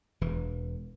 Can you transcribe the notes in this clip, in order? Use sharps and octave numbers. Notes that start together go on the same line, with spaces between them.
E1 E3